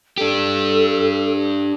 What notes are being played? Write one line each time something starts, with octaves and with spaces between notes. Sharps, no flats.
D4 G4 A4